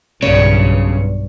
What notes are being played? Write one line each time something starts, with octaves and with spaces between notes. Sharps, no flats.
B1 G2 C#3 C#5